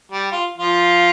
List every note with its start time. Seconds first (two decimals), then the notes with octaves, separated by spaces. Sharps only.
0.12 G3
0.32 F4
0.58 F3 F4